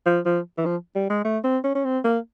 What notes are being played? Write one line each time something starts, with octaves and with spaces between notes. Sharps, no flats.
F3
F3
E3
F3
G3
G#3
A3
C4
C#4
C#4
C4
A#3